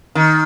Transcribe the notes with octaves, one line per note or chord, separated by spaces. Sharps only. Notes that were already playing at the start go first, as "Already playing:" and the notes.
D#3